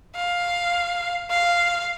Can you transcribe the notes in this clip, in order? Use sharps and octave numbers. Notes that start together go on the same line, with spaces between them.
F5
F5